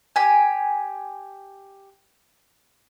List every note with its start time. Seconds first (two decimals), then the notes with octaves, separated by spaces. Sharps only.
0.16 G4 G#5